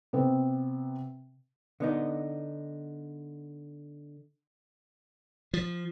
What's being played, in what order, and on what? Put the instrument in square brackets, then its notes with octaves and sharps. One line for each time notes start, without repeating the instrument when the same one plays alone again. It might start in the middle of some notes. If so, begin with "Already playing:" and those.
[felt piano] C3 B3 C4
[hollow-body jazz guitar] D3 B3 D#4
[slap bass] F3